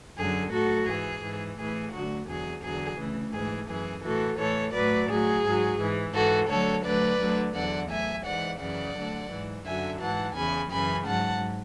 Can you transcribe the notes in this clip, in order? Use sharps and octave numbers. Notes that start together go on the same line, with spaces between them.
F#2 D3 F#3 G#4
A2 F#3 F#4 A4
G#2 E3 G#4
G#2 E3
A2 E3 G#4
D2 D3 F#3 F#4
E2 D3 F#3 G#4
E2 D3 F#3 G#4
D2 C#3 E3
G#2 E3 G#4
F#2 E3 G#4
A2 E3 F#4 A4
A2 E3 A4 C#5
A2 F#3 B4 D5
A2 F#3 G#4
G#2 F#3
G#2 E3
G#2 E3 F#4 A4
D2 D3 F#3 A4 C#5
D2 D3 F#3 B4 D5
D2 D3 F#3
E2 D3 F#3 D5 F#5
A2 F#3 E5 G#5
G#2 E3 D5 F#5
F#2 C#3 E3 D5 F#5
D2 D3 F#3
G#2 E3
F#2 D3 F#3 E5 G#5
G#2 E3 F#5 A5
E2 C#3 E3 G#5 B5
F#2 C#3 E3 G#5 B5
G#2 F#3 F#5 A5